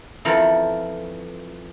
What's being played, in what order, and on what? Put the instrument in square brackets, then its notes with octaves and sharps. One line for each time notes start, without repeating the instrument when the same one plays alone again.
[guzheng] F2 E3 F3 A4 A#4 A#5